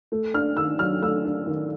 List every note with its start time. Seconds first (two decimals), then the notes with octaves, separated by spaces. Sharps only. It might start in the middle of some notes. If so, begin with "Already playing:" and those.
0.12 A3
0.34 D4 F6
0.57 D#3 E6
0.79 F#3 F6
1.02 A3 E6
1.25 D4
1.47 D#3